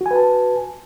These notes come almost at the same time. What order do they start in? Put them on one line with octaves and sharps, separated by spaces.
F#4 G#5 B4 A5